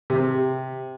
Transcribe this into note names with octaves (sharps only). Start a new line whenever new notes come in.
C3